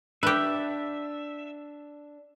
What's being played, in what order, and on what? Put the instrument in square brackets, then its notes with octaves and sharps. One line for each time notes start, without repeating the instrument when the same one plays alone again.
[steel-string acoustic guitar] D4 [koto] G4 B4 [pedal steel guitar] E5